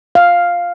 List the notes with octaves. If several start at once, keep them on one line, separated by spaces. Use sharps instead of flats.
F5